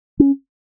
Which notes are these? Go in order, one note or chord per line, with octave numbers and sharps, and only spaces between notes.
C#4